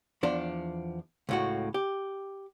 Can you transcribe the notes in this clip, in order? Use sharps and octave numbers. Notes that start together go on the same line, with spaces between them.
E2 F3 D4
C#2 A2 F#4
G4